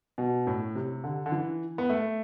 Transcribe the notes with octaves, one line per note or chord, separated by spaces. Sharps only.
B2
A2
C3
D3
D3
E3
B3
A3